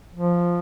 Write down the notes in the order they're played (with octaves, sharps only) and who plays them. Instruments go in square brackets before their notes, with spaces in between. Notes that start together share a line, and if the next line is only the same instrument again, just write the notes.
[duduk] F3